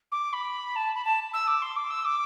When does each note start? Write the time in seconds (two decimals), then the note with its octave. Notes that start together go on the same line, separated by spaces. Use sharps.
0.12 D6
0.33 B5
0.76 A5
0.95 B5
1.05 A5
1.34 E6
1.47 D6
1.62 C6
1.76 D6
1.91 E6
2.05 D6